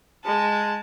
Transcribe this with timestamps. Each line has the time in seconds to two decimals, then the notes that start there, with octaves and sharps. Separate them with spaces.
0.25 G#3 A5